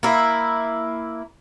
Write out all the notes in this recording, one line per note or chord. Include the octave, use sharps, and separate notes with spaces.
A#3 E4